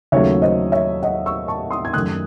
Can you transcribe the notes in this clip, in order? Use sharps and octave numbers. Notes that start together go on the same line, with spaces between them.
D#2 C#3 F#3 A3 C#5 E5
C5 D#5
C#5 E5
D#5 F#5
C#6 E6
A5 C#6
C6 D#6
G#6
F#2 D#3 A3 D#6 F#6